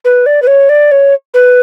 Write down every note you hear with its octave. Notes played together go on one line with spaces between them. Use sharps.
B4
D5
B4
C#5
D5
C#5
B4